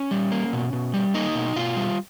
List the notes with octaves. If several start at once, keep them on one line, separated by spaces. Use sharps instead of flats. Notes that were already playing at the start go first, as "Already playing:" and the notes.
Already playing: C#4
G3
A#3
B2
B2
G3
A#3 D#4
B2
B2 F4
G3